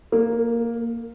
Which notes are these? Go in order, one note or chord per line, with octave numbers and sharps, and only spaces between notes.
A#3